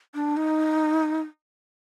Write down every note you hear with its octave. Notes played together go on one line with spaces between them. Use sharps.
D4
D#4